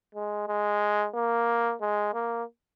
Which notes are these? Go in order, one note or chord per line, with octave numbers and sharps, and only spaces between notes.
G#3
G#3
A#3
G#3
A#3